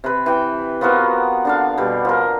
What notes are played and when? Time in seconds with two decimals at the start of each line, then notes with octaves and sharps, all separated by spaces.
0.04 C3 B4
0.26 E3 G5
0.81 F3 B3 F#4 A#4
1.45 D3 D4 F5
1.78 B2 G3
2.05 F3 A#4